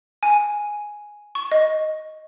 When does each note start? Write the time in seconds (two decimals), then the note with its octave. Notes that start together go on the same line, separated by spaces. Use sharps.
0.23 G#5
1.35 C#6
1.52 D#5